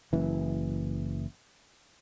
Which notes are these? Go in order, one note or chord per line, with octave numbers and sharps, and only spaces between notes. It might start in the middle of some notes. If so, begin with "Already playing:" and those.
F#1 E3